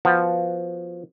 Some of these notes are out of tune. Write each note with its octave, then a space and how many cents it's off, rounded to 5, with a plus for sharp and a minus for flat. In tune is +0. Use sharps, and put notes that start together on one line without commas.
F3 +0 B3 +0 F#4 +0